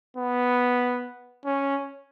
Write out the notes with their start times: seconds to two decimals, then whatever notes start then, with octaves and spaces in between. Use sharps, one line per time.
0.17 B3
1.46 C#4